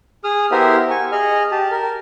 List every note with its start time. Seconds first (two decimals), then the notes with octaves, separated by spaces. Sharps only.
0.24 G#4 D#6 F6
0.51 B3 E4 G4 A#4 C5 E5
0.90 G#5 C#6
1.12 G#4 D#5 F6
1.51 G4 A5
1.71 A#4